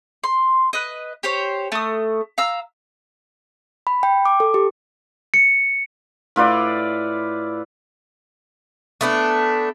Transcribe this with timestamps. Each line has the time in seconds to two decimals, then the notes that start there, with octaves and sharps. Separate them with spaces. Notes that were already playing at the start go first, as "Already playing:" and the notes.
0.24 C6
0.73 B4 D#5
1.23 G4 C5 C#5
1.72 A3 D#6
2.38 F5 A#5 E6
3.87 B5
4.03 G5
4.25 D6
4.40 A4
4.54 G4
5.34 C#7
6.36 A2 F4 B4 D5
9.01 A3 B3 D4